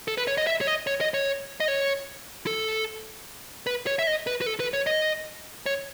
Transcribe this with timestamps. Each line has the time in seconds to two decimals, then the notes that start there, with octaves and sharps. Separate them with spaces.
0.08 A4
0.18 B4
0.27 C#5
0.38 D#5
0.47 E5
0.61 C#5
0.67 D#5
0.87 C#5
1.01 D#5
1.14 C#5
1.60 D#5
1.68 C#5
2.47 A4
3.67 B4
3.87 C#5
3.99 E5
4.07 D#5
4.27 B4
4.41 B4
4.46 A4
4.60 B4
4.74 C#5
4.87 D#5
5.66 C#5